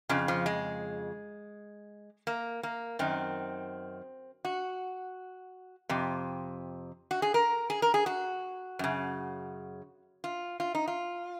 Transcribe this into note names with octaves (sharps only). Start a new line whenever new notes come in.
F2 C#3 F3
F3
G#3
A#3
A#3
F#2 D#3 C4
F#4
F2 C3
F#4
G#4
A#4
G#4
A#4
G#4
F#4
F#2 C#3
F4
F4
D#4
F4